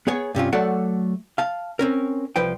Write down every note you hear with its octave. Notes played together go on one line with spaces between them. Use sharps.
B3 G#4 C#5 G#5
G2 C3 C#4 F4
F#3 A3 F#4 A4 D5 F#5
F5 A5
C4 C#4 A#4
C2 F3 B4 C5 G5